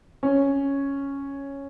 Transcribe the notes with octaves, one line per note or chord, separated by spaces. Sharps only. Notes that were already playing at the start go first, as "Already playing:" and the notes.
C#4